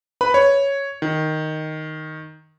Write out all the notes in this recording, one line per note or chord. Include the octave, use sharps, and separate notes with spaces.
B4 B5
C#5
D#3